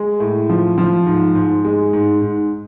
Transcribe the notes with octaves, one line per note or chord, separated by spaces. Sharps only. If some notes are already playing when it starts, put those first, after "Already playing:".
Already playing: G#3
A2
F3
F3
G#2
G#2
G#3
G#2
G#2